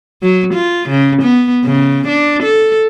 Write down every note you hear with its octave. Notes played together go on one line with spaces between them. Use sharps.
F#3
F4
C#3
B3
C#3
D4
A4